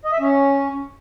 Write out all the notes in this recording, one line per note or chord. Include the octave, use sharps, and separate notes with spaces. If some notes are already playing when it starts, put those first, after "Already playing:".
D#5
E5
C#4